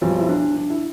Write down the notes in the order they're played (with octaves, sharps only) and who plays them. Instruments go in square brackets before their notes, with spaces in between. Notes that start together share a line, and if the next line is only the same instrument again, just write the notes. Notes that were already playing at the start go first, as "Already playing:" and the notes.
[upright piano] B1 B2 G3 C4 [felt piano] F3
[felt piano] E4
D4
D4
E4